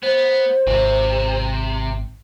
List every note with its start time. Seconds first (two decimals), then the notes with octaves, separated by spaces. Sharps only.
0.03 B3 C5
0.67 G#1 C3